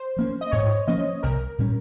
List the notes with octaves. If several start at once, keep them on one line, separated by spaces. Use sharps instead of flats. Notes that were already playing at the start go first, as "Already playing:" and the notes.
Already playing: C5
F3 A#3 C#4
D#5
G#2 C#5
F3 A#3 C#4 D#5
C2 A#4
A#2 G3 C#4